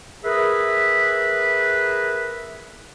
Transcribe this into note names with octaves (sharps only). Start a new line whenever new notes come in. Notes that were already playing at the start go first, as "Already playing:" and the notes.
G#4 A#4 B4 E5